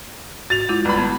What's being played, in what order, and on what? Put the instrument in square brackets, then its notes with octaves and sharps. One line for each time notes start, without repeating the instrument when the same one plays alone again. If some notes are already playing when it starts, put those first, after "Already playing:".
[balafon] F#4 [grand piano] A6 F7
[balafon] G#3 E4 F4
[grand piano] G1 B5
[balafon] B3